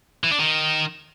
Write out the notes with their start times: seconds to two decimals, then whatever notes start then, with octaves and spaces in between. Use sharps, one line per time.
0.24 E3
0.31 D4
0.39 D#3